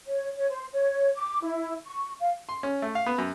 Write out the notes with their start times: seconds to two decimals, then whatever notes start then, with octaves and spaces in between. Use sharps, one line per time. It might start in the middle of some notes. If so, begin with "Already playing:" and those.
0.06 C#5
0.36 C#5
0.51 C5
0.73 C#5
1.16 D6
1.43 E4
1.86 C#6
2.21 F5
2.49 C6
2.63 C#4
2.82 A3
2.95 F5
3.06 B3
3.18 F#2